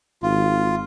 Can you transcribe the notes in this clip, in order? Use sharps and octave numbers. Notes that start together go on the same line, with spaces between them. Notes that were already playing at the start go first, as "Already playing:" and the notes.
G#1 F4